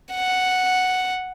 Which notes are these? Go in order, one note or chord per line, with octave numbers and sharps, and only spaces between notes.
F#5